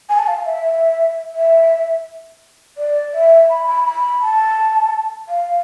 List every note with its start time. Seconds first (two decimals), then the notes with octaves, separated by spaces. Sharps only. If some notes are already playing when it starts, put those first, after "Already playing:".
0.09 G#5
0.19 A5
0.27 F5
0.46 E5
1.36 E5
2.78 D5
3.14 E5
3.50 B5
3.67 B5
3.86 B5
4.22 A5
5.29 F5